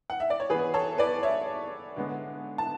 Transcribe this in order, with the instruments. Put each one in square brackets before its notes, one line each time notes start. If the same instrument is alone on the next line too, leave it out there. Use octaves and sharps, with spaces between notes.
[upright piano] F#5
E5
D5
C#5
E3 B3 G#4 B4
A4 C#5
B4 D5
C#5 E5
D3 G#3 B3
A5